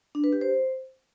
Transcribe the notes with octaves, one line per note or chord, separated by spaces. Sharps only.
D4
B4
G4
C5